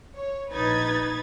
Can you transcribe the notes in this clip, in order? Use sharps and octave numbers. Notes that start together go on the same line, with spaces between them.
C#5
A#1 D#4 B4 G#6 A6